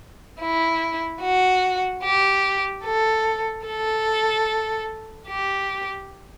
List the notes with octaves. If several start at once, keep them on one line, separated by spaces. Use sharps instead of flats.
E4
F#4
G4
A4
A4
G4